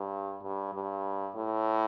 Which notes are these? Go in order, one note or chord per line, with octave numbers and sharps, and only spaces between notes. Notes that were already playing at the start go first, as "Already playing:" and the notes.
Already playing: G2
G2
G2
A2